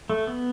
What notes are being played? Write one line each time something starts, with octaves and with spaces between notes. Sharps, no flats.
A3
B3